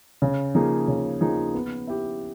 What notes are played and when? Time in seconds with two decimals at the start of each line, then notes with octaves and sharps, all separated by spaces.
0.22 C#3
0.55 F3 A#3 D#4 G#4
0.88 C#3
1.21 F3 A#3 D#4 G#4
1.54 B3
1.87 E4 G4